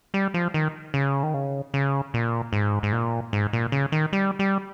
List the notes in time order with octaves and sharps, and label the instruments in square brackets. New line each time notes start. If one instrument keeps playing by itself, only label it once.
[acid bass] G3
F3
D#3
C#3
D#3
C#3
C#3
A#2
G#2
G#2
A#2
G#2
A#2
C#3
D#3
G3
G3